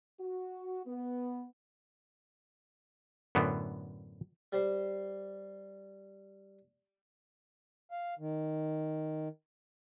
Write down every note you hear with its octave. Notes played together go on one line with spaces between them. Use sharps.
F#4
B3
F#2 A2 D3 B3
G3 G4 C5
F5
D#3